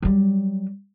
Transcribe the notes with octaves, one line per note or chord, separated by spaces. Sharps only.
F#3 G3